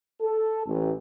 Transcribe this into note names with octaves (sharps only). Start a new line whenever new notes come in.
A4
A1